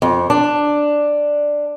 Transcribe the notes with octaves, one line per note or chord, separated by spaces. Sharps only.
F2
D4